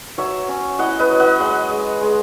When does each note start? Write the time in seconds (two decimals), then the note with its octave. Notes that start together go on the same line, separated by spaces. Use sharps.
0.18 F#3 C#5 E5
0.49 C#4
0.79 E4 D#5 F#5
0.99 B4 D#5
1.10 F#3
1.20 D#5 F#5
1.40 G#3 D#5 F#5
1.70 G#3
2.01 G#3